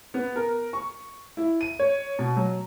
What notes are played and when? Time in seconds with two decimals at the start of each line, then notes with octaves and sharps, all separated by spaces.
0.14 B3
0.36 A#4
0.73 C#6
1.37 E4
1.61 D#7
1.79 C#5
2.19 B2
2.37 F#3